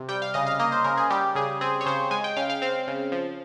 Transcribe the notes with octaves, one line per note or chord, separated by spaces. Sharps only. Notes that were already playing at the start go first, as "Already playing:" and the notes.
Already playing: C3
G3 G5
F5
C#3 D#5
F5
A#3 D#5
C5
C#3 A#4
G#4
G3 G4
C#3 G#4
C4 G#4
C#5
C#3 C5
G#3 G#5
G5
C#3 F5
F5
C4 F5
C#3
F3